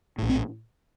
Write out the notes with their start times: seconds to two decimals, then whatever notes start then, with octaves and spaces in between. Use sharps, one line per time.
0.18 A#1 A2
0.29 C4